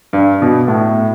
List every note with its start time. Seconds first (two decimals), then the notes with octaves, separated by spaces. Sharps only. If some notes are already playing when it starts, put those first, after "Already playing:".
0.13 G2
0.42 B2
0.68 A2